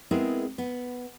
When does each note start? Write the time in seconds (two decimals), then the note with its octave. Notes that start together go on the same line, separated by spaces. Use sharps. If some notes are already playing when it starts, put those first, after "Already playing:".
0.11 G#3 B3 C4 E4 G#4 A#4
0.58 B3